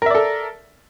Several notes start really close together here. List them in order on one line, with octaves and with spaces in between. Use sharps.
A#4 E5 D5 A4